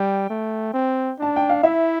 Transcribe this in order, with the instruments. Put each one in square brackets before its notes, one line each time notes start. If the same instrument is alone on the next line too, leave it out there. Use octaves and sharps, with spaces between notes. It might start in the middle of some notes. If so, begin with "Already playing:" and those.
Already playing: [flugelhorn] G3 [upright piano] G5
[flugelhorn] A3
C4
[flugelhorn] D4 [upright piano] A5
[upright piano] G5
F5
[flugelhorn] E4 [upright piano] E5